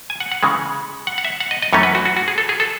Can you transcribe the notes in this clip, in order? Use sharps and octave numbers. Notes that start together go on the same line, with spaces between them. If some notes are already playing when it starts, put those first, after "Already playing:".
G#5
F#5
F#5
C#3 E3 G#3
F#5
F#5
E5
F#5
D#5
D#5
F#2 E3 A3 C#4 C#5
B4
F#4
F#4
F#4
G#4
A4
G#4
A4